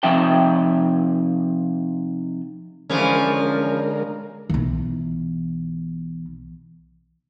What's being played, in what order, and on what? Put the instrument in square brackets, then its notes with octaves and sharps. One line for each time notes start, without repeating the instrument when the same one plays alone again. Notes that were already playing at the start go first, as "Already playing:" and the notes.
[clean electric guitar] C3 F3 D#4 E5 G5
[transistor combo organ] D3 G#3 A#4 [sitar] E3 F3 C#4
[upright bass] B1 E3